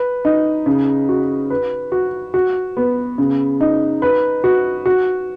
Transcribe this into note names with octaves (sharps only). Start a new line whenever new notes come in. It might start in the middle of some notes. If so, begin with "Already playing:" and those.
Already playing: B4
D#4
C#3
F#4
B4
F#4
F#4
B3
C#3
D#4
B4
F#4
F#4